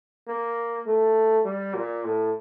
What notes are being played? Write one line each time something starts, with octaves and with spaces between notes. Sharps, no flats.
A#3
A3
G3
A#2
A2